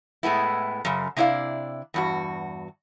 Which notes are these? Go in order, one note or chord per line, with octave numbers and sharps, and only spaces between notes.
A2 G#3 B3 E4
F#2 C#3
C3 D4 E4 D5 F5
E2 G2 F#4